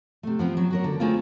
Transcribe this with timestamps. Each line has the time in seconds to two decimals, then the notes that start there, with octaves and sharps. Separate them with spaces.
0.23 C3 A3
0.39 F3 B3 C4
0.57 F#3
0.70 F#4 A#4 C#5
0.84 D3
1.00 G#3 A3 C4 C#4 E4 F4